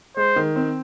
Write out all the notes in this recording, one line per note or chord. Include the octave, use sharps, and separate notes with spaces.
G#3 C5
D#3
C4